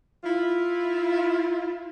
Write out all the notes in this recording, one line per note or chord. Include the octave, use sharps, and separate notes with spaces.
E4 F4